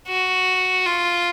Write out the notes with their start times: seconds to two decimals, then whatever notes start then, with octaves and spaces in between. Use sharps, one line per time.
0.08 F#4
0.86 F4